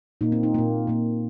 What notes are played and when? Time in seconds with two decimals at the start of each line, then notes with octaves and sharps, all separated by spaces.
0.21 A#2 A#3 D#4
0.32 C4
0.43 D#4
0.54 A#2 A#3
0.87 A#2 A#3